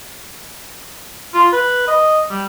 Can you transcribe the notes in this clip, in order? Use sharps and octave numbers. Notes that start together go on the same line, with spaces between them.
F4
B4
D#5
G3